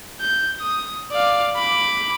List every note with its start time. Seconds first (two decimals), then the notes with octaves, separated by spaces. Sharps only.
0.21 G6
0.60 D#6
1.11 D5 F5
1.56 B5 D6